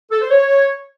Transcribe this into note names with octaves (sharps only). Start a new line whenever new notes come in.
A4
C5
C#5